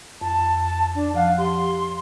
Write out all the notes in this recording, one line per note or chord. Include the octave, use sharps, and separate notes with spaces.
F2 A5
D4
F3 F5 F#5 F#6
G4 C6